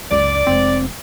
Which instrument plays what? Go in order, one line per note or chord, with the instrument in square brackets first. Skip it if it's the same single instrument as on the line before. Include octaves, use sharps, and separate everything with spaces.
[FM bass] C#2 [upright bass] F#2 [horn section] D5
[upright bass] F1 G#3 [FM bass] C4